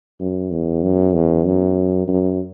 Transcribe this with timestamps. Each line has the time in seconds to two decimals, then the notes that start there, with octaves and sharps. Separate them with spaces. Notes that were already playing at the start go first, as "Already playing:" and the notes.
0.20 F#2
0.52 E2
0.83 F#2
1.15 E2
1.45 F#2
2.08 F#2